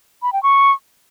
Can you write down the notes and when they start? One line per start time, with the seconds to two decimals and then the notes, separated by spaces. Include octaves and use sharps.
0.23 B5
0.33 G5
0.43 C#6